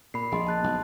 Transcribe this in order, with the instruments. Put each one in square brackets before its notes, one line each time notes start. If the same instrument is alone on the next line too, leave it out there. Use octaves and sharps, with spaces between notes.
[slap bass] A#2 [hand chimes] B5 C7
[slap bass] A#1 [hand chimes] G#4 D#5 C6
[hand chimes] A5 F#6 A6
[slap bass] B1